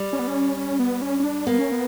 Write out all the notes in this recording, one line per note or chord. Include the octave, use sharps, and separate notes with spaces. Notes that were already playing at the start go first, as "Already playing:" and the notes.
Already playing: G3
C#4
B3
C#4
C#4
B3
C#4
C#4
D4
A#3 B3
C#4
B3